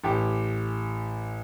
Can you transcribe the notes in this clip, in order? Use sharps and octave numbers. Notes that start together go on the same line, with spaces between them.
A1 G4